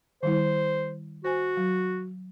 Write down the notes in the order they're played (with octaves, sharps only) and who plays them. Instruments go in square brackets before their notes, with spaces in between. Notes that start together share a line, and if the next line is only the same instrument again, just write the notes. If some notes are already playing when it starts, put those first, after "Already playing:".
[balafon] D#3 G3 E4 [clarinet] C5
[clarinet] F#4 [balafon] C5 G#5
[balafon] F#3